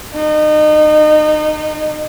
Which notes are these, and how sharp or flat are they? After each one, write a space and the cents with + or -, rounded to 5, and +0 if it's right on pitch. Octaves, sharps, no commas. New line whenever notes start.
D#4 -30